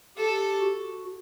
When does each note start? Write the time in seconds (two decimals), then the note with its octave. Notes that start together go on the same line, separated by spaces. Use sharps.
0.17 G4 A4
0.60 F#4